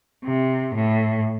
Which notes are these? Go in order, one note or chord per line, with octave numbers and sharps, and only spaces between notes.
C3
A2